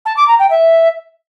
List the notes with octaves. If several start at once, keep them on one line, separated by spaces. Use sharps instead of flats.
A5
D6
A#5
G5
E5